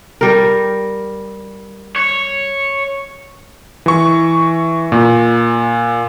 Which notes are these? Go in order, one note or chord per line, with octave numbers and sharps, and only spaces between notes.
G3 A#4
C#5
E3 C#6
A#2